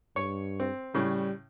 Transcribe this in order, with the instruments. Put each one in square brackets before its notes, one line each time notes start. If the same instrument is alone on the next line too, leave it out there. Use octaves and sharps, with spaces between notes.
[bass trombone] G2 [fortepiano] C#5
[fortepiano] C4
[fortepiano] A2 C#3 [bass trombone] G3